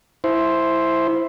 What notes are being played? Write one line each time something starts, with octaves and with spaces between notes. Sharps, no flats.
E4 C5